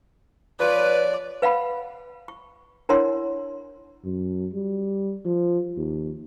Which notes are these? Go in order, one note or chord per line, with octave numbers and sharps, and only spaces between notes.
F3 B4 C#5 D5
B4 F5 F#5 B5
C#6
D4 E4 A#4 C#5 F#5 C6
F#2
G3
F3
D#2